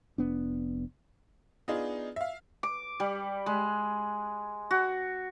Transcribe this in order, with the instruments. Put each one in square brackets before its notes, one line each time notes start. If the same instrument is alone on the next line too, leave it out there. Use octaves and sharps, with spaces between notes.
[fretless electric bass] F1 B3 D4
[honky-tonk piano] B3 D4 D#4 F4 G#4
E5 F5
[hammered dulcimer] D6
G3
G#3
F#4